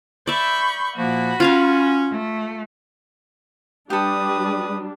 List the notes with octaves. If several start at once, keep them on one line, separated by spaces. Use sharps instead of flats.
D5 E5 B5 C#6 G6
A#2 F3 A#3 F#4 B5
C#4 F4 F5 G#5
A3
G3 D4 G4 A4 B4 D#6